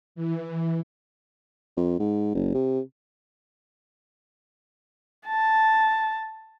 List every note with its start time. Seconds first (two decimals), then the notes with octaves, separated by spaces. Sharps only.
0.15 E3
1.77 F2
1.99 G#2
2.34 F#1
2.54 C3
5.27 A5